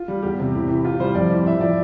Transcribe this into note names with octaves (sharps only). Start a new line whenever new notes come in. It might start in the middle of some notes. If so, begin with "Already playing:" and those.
Already playing: F4
G3
E2 G4
C3
A2
E3
A2 F4
G3 C5
F2 D5
E3
A2 E5
F3 D5